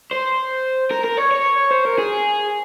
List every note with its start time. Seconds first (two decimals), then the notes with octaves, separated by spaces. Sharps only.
0.11 C5
0.91 A#4
1.04 A#4
1.18 C#5
1.32 C#5
1.71 C5
1.85 A#4
1.98 G#4